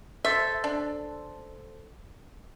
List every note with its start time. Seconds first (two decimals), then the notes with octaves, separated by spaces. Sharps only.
0.25 A4 C5 E5
0.64 D4